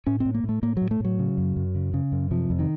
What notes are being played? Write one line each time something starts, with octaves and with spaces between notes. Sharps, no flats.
A2 C#4
C4
A2
A#3
A2
A3
A2 A#3
A2 F#3
A3
A2 F#3
C#3
F#2
F#2
C#3
C#3
F#2
C3 F3
F2
D#3